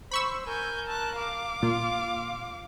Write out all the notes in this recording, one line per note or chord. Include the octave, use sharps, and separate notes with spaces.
C5 B5 C#6 E6
A#4 G#5 G6
A5 F#6
F5 D6
A#2 F4
F4